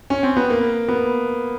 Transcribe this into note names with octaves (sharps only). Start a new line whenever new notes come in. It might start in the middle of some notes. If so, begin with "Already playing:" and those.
C#4
C4
B3
A#3
B3